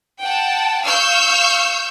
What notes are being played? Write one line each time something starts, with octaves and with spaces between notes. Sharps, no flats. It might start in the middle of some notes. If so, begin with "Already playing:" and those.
F#5 G5 A5
F5 C#6 E6 F6 G6